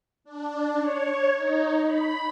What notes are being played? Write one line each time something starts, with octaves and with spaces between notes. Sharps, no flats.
D4
C#5
D#4
B5